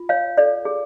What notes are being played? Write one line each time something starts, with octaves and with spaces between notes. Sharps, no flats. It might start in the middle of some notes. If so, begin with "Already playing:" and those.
Already playing: F4
C#5 F5
A4 D5
G#4